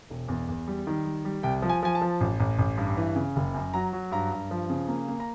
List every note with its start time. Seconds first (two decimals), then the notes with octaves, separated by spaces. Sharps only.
0.10 E1
0.28 E2
0.49 E2
0.68 G3
0.87 D#3
1.05 G3
1.25 G3
1.43 C2 G5
1.62 F3
1.69 G#5
1.83 F3 G#5
1.95 A5
2.02 F3
2.21 A1
2.40 A1
2.59 A1
2.77 G2
2.97 E3
3.16 C#3
3.36 F#1
3.54 F#2
3.74 F#3 A#5
3.93 F#3
4.12 G2 A#5
4.32 G2
4.51 F3
4.70 C#3
4.88 A#3
5.08 A#3
5.20 A#5